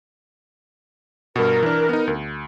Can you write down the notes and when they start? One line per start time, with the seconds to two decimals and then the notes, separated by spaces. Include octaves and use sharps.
1.36 G2 B2 A#4
1.63 E3 D4
1.89 B3 D#4
2.07 D2